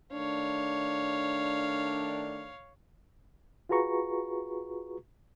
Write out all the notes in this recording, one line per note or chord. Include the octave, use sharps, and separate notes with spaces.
D#3 A3 D4 C#5 F5
F4 F#4 G#4 B4 A#5 C#6